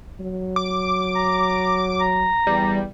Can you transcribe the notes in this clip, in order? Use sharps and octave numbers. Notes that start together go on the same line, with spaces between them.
F#3
D6
A#5
A#5
E2 G3